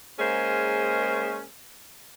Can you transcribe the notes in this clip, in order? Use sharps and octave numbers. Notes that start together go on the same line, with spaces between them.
G#3 A#3 C#4 G#4 A#4 C5